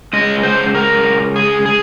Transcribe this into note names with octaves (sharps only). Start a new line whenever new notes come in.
C#3 G#3 D#5
C5
A#4
G#4
G#4